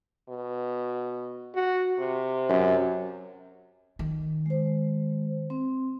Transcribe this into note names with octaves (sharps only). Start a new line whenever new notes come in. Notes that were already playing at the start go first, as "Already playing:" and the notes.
B2
F#4
C3
F#2
D#3
G#3 C5
C4